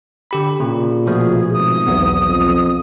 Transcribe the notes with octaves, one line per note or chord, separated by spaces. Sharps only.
D3 G4 B5
A#2 C#3
B2 F3 A3 G#4
G#1 D#6
B1 E2 B3
F2